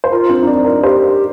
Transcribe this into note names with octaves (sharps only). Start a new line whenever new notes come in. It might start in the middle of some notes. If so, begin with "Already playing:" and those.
C5
F4 A#4
C4
D#4
D4
A#4
G4 C5